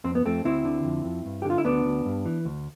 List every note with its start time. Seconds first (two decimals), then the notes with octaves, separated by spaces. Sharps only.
0.04 F2 C4
0.15 B3
0.25 F2 A3 C4
0.45 D2 C4 E4
0.65 D3
0.84 F2
1.05 F2
1.26 G2
1.42 G4
1.45 D3
1.50 F4
1.58 E4
1.65 D2 B3 D4
1.85 D2
2.06 G2
2.25 E3
2.45 D2